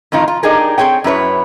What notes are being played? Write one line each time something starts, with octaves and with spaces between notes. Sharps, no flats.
F2 A2 D#3 D#4 F4
F4
D4 D#4 G4 G#4 A#4
C4 C#4 G#4 C#5 G5
F#2 E4 B4 C#5